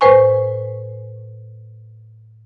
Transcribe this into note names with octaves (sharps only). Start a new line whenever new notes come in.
A2 B4 C5 G#5 C#6